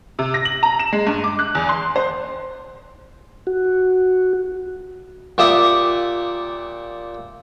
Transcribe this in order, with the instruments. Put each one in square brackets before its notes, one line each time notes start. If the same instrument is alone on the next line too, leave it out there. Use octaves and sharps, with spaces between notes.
[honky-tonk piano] C3
A#6
F#7
A#5
E7
G#3
G2
D6
F#6
E2
C6
C5
[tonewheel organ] F#4
[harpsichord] A#2 G4 E5 D#6